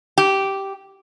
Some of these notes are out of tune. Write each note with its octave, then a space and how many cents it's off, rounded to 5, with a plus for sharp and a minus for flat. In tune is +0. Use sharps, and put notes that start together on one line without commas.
G4 -10